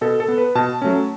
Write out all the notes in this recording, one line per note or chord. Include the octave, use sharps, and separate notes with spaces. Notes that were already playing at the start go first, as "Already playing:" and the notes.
B2 A4
A4
B3
B4
B2 A5
F#3 A3 C#4